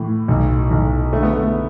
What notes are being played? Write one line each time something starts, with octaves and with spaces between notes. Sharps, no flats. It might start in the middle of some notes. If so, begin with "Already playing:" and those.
Already playing: A2 E3
B1
B1
D3 A3
B3
A3